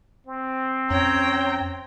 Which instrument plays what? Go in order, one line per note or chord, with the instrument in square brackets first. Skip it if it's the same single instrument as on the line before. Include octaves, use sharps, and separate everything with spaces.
[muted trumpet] C4
[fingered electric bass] F2 C#4 [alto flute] C#5 [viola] G5 A#5